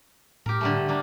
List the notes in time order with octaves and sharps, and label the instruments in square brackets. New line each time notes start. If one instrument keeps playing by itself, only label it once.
[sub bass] A2 [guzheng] G4 A#4
[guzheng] D3 G3 A3
G3 A#3 D4